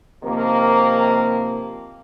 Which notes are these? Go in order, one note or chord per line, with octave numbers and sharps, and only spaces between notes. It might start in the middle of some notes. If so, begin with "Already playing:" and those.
C3 D#3 F3 A#3